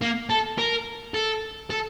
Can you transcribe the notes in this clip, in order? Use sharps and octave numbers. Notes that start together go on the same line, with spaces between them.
A#3
A4
A#4
A4
A4